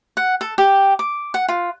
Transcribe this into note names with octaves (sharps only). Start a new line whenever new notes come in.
F#5
A4
G4
D6
F#5
F4